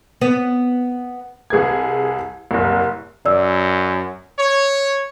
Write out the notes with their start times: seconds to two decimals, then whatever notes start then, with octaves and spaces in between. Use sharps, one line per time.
0.21 B3
1.50 C2 G#4 B4 G#6
2.51 F#1 C2
3.25 F#2 D5 E6
4.39 C#5